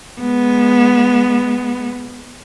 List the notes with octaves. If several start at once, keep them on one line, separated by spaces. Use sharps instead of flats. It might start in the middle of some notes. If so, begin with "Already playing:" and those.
G#3 B3